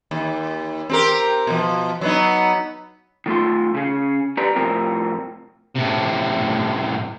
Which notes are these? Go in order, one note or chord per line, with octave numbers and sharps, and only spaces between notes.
D#2
C4 G4 A#4
B2 F3
F#3 B3 D#4
D#3 A3 F4 C6
C#3 G#4
G4 B4 D5 A#5
F2 A2 C3 F3 C4 A#4
A2 C3